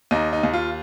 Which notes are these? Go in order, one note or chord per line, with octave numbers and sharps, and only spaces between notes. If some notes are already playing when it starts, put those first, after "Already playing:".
D#2 D#4
D#4
D#2
F4